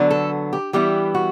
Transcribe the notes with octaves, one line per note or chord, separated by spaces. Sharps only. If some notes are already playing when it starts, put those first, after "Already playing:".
Already playing: D3 F#3 B3 D4
A4
G4
E3 G3 B3 E4 G4
F#4